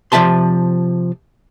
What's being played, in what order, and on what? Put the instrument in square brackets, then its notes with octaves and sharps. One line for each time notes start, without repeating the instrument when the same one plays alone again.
[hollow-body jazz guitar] C3 F3 D5 E5 A5 C6